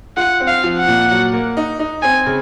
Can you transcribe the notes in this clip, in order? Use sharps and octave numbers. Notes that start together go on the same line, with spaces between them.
F4 F#5
C4
F5
F3
F#5
A#2
F#3
A#3
D#4
D#4
C4 G#5
C#3